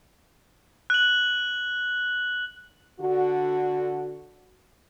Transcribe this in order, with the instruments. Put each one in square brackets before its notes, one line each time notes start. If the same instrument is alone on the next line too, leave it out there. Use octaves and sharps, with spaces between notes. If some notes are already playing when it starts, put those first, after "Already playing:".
[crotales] F#6 F#7
[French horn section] D3 F#4